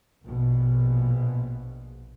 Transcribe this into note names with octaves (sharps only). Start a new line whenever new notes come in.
A#1 B2